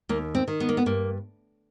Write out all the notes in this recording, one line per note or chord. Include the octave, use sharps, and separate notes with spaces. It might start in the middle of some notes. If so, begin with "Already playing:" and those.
D#2 A#3
C4
D#3
B3
A#3
B3
G2 A#3